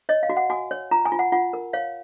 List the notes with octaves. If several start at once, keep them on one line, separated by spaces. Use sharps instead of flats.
C#5 D#5
F5
F#4
F#5
F#4 G#5
C#5
F4 A#5
G#5
F4
F#5
F4 F#5
A#4
C#5 F5